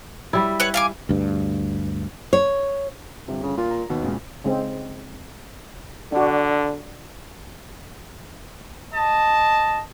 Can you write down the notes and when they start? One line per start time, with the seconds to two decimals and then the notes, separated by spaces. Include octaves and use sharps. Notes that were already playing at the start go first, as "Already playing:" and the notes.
0.33 G3 E4
0.60 B4 C#5 F#5
0.74 F5 G#5 D6
1.09 D2 G2
2.33 C#5
3.28 G1 C3
3.43 C#3
3.57 A#2 F4
3.70 A#5
3.90 D#2 B2
4.02 C#2 A#2 C#3
4.44 C#3 G#3 C4
6.12 D3 D4 F#4
8.93 D#5 A5